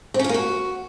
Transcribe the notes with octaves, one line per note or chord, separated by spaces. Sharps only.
C4
C#4
F4
A#3
F#4